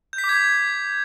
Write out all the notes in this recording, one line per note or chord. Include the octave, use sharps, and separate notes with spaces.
G6
B6
D6
G#6